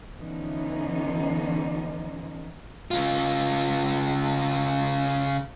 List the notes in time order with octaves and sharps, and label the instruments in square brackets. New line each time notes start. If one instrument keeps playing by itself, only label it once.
[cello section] D3 E3 F3 B3 C#4 D#4
[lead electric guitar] C#3 F4